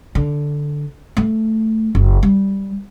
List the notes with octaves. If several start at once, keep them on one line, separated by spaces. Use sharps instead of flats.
D3
A3
F#1
G3